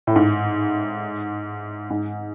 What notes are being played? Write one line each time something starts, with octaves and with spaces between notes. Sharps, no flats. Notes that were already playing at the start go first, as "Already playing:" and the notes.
A2
G#2
G#2